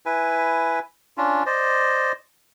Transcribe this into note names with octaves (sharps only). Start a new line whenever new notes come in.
E4 B4 G#5
C#4 D4 F4
C5 D5 D#5